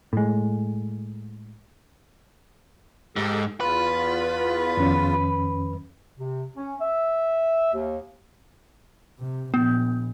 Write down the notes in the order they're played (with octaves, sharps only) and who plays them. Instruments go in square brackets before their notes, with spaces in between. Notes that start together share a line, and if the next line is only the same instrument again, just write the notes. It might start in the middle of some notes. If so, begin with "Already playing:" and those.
[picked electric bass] A2 G#3
[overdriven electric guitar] G#2 [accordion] G4 A4 E6
[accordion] E2 F4 [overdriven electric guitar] B4
[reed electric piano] F2 D#3 C#4
[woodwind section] C3
C#4
E5
D#2
[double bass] C3
[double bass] A#1 [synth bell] B3